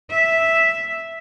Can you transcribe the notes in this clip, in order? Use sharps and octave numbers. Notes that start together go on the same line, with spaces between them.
E5